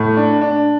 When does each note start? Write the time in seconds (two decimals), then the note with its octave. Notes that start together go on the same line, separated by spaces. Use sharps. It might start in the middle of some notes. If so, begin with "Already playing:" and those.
Already playing: A2
0.17 D4
0.41 D4